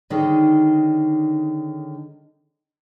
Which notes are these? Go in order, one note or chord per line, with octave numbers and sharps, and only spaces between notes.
D3 D#3 G#3 C#4 D#4